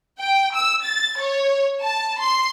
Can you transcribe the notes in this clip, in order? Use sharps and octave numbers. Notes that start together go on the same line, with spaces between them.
G5
E6
A6
C#5
A5
C6